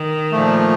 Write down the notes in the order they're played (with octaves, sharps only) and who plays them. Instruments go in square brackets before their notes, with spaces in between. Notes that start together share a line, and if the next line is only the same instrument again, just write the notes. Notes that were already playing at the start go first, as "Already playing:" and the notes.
Already playing: [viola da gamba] D#3
[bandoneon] A#2 F3 A3